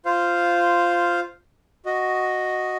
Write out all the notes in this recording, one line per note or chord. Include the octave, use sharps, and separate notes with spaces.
F4 C5 F5
F#4 D#5